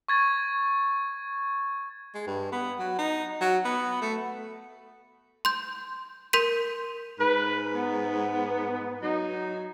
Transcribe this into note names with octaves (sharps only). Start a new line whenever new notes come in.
C#6 G#6 A6
G#3
G2
B3
F#3
D#4
F#3
B3
A3
C6 G6
A#4 C6 G6 B6 D#7
G#2 B4
B3
F#3 D#4